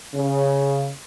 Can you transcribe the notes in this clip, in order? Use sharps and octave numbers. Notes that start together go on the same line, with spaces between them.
C#3